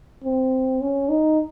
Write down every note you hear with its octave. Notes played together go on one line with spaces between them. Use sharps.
C4
C#4
D#4